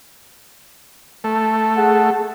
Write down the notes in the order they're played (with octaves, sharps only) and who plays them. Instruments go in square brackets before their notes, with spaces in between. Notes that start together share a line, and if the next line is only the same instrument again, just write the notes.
[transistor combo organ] A3
[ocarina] G#4 [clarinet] F#5